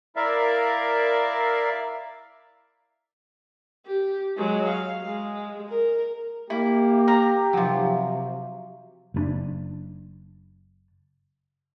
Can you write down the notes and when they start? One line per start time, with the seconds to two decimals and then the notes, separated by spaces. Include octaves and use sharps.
0.16 E4 A#4 D5 E5 F5
3.87 G4
4.37 F#3 G#3
4.68 F5
5.04 G#3
5.70 A#4
6.50 A#3 E4 G4
7.08 A#4 A#5
7.53 C3 F3 F#3
9.14 F#1 A#2 D4